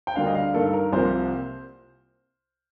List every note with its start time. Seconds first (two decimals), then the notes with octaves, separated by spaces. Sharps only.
0.07 G5
0.15 D2 D3 G3 A#3 F5
0.27 D#5
0.35 F5
0.54 G2 D#3 A#3 A4
0.73 A#4
0.93 C2 C3 F3 A#3 C5